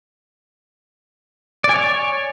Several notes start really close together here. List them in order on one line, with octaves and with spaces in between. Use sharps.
D5 G#5 C#5